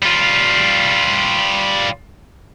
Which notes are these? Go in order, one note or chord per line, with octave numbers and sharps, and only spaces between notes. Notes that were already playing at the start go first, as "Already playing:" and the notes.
G3 F4